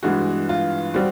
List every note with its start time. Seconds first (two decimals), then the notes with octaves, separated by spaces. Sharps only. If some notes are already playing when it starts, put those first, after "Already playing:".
0.03 G2 E3 G#3 B3 F#4
0.49 F4
0.94 G3 C4 F#4